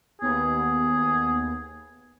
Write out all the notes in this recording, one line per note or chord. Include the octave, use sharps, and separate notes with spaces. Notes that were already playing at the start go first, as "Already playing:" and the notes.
D#2 B3 G#4